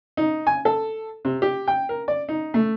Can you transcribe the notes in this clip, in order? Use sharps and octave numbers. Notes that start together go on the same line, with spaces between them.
D#4
G#5
A4
C3
G4
G5
A#4
D5
D#4
A3